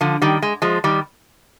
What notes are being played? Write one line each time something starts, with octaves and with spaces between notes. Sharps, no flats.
D3 F3
D#3 G3
G#3
F3 G#3
D#3 G3